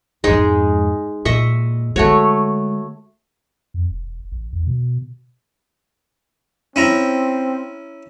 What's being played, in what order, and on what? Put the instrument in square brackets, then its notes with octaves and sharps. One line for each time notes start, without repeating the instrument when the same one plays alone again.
[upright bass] F2 G#2 [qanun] G#3 D#4 G#4
[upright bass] A#2 [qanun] D#5 E5 C#6
[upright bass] D3 G#3 [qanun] A3 F#4 C#5
[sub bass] F2
E1
A1
E2
B2
[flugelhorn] C4 [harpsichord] C#4 E4 A#5